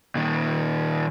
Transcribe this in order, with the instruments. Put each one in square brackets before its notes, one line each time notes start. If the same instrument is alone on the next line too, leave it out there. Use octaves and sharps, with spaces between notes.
[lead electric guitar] A#2 D#3